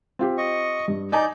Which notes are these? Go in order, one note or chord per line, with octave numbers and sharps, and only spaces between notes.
C4 F4 G4
D#5 C#6
G2
D#4 D5 D#5 G#5 A#5 G6